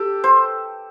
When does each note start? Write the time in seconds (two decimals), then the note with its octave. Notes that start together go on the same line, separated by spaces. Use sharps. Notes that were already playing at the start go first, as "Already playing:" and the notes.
Already playing: G4 A4
0.24 C5